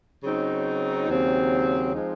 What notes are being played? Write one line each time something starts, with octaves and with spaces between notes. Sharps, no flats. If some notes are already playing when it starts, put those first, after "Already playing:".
C#3 F#3 C4 D#4
D#2 C#3 F#3 C4
F3 G#3 C4 D#4